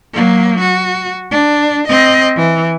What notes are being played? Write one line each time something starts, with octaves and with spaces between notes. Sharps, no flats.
F#3 A#3
F#4
D4
C4 D#5
E3